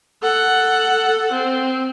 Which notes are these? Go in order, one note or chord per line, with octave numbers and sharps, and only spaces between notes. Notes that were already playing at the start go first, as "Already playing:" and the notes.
A4 F#5
C4